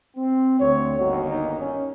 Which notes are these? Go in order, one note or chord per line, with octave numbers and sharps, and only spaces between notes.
C4
D2 C4 C#5
G1 D#2 F#4
D#4
C#4